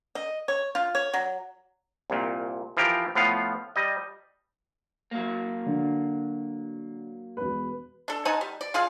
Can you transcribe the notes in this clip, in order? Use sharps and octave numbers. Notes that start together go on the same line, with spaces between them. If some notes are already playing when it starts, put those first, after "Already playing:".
D#5
C#5
F4
C#5
F#3
C2 A#2
E3 F3 F4 G4 A#4
A2 F3 B3 F4 F5
G3 D#5
F#3 A#3
D3
E1 B4
D4 A4
D#4 F#5 G#5 A5
G3
D5
F4 G#4 F5